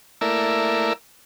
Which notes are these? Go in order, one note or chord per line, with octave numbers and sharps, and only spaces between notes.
A3 A#3 E4 A#4 D5 E5